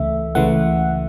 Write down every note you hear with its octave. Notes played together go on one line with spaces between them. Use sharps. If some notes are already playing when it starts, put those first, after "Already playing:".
Already playing: C#2 C#3 E3 A3 E5
C#2 C#3 E3 A3 F#5